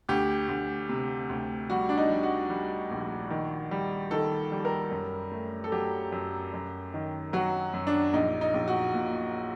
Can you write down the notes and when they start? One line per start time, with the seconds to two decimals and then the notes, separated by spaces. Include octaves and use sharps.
0.09 D2 G4
0.49 D2
0.89 C3
1.30 D2
1.70 G3 F#4
1.89 D4
1.97 D#4
2.10 G3
2.23 F#4
2.50 G3
2.91 A#1
3.30 D#3
3.71 G3
4.11 D#3 A4
4.52 G3
4.65 A#4
4.91 F#2
5.32 A3
5.64 A4
5.72 F#3 G4
6.12 F#2
6.54 F#2
6.94 D#3
7.33 F#3 F#4
7.73 F#2
7.87 D4
8.13 A#1 D#4
8.41 D#4
8.54 A#1
8.68 F#4
8.94 A#2